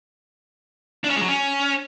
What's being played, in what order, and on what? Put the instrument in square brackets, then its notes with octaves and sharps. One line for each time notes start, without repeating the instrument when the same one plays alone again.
[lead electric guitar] D4
C#4
G#3
F#3
C#4